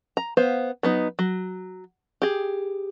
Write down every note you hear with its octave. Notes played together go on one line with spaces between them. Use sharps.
A#5
B3 C5 F5
F#3 B3 D#4
F#3
G4 G#4